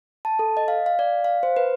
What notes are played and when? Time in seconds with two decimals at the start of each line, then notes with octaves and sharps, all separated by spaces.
0.25 A5
0.39 A4
0.57 D#5
0.68 F5
0.86 F5
0.99 D5
1.24 F5
1.43 C5
1.57 B4